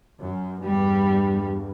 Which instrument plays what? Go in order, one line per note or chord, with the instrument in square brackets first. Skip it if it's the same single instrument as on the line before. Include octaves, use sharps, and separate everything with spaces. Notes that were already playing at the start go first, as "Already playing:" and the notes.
[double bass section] F#2
[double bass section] E2 G2 [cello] G3